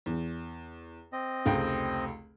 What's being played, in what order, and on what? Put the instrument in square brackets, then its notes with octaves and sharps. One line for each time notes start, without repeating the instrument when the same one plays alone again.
[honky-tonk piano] E2
[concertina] C4 D#5
[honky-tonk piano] F1 C#2 G5